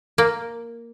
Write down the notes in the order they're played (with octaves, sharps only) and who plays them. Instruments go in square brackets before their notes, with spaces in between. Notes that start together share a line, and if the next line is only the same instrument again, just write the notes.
[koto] A#3